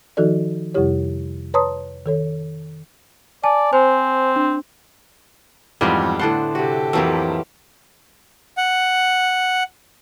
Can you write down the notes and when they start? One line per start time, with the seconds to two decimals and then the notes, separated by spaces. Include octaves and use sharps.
0.17 D#3 F3 D#4 F#4 A4 D5
0.74 F2 C3 G3 E4 G4 C#5
1.54 B4 C#5 A5 A#5 C6 D#6
2.06 D#3 A4 C#5
3.44 D5 G#5 A5
3.73 C4 C5 G#5
4.36 D4
5.81 F2 G#2 E3 G3 B3 F4
6.19 A2 D3 D4 C5 F#5 A5 C7
6.55 C3 F#4 G4 A4
6.93 F2 E3 F#3 A#3 C5 A5 E6
8.57 F#5